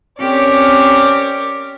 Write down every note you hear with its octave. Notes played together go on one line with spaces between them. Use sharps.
C4 C#4 G4 A#4 C#5 D5